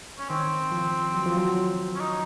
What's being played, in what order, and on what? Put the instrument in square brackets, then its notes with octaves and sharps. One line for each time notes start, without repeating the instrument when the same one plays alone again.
[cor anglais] C#4
[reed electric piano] D#3 [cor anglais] C4
[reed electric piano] F3
F#3
F3
F#3
[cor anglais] C#4
D#4